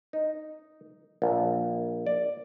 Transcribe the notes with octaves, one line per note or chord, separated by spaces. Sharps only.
D#4
A#1
D5